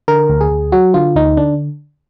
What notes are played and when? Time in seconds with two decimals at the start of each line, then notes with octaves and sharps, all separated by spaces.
0.08 D3 A#4
0.29 D2
0.41 G#4
0.51 D2
0.72 F#3 F#4
0.94 D3 F4
1.16 D2 D#4
1.37 D3 D4